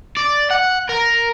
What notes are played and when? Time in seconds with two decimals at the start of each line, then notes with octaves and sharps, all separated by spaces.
0.17 D5
0.51 F#5
0.89 A#4